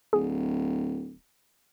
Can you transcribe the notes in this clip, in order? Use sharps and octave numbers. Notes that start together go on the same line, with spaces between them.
D1 G#4